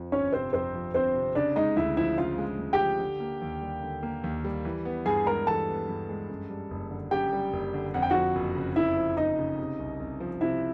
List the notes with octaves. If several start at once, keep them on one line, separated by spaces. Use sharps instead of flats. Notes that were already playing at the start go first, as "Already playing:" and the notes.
Already playing: F2 F3
G1 C#4 C#5
C3 C4 C5
F2 C4 C5
F3
G1 C4 C5
C3
C#3 D4 D5
G#3 D#4 D#5
D2 E4 E5
F3 E4 E5
C#3 F4 F5
G#3
D2
G4 G5
F3
D3
A#3
D#2
G3
D3
A#3
D#2
G3
E3
B3
G2 G#4 G#5
G#3 A#4 A#5
E3 A4 A5
B3
G2
G#3
F#2
G3
F#1
D3
F#2 G4 G5
G3
F#1
D3
F2 F#5
G5
F3 F#4 F#5
F#1
C#3
F2 E4 E5
F3
F#1 D#4 D#5
C#3
C3
C2
C2
F3
C3 E4 E5